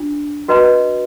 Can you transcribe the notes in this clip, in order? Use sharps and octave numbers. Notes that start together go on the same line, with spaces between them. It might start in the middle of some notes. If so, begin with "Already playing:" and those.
Already playing: D4 F4
F#4 B4 D#5 A#5